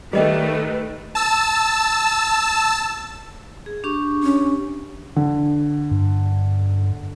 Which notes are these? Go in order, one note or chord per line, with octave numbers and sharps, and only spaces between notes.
D#3 G3 A3 G#4 B4 D#5 G5
A5 E6
G#4
D4 G4 C#6
C#4
D3
G2